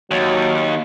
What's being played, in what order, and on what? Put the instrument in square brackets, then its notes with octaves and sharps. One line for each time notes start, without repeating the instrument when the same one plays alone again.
[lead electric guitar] D#2 [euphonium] F#3